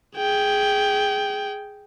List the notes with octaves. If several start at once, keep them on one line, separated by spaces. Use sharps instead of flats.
G#4 G5